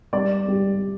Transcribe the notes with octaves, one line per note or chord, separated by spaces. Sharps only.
G3 D5
G3